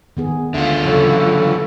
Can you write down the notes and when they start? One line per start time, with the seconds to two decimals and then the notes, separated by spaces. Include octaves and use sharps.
0.17 D#3 B3 G#4
0.54 D2 D3 F4 E5
0.85 C#3 E3 F#3 A4 C#5